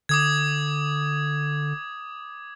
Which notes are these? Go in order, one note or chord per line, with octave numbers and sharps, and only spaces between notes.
D3 D6 D#6 G#6